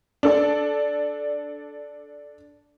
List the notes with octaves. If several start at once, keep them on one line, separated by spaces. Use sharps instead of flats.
D4 A4 D5